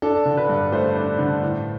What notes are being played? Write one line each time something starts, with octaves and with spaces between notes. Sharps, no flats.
D4 A4
D3
B4
G2
A3 C5
D4
D3
A2